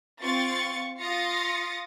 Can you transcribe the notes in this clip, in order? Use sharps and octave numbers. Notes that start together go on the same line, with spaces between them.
C4 F4 C#6 A6
F4 F5 D#6 A6 A#6 C#7